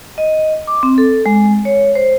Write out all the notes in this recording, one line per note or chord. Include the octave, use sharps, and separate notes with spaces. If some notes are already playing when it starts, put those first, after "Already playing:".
D#5
D6
C4
A4
G#3
C#5
C5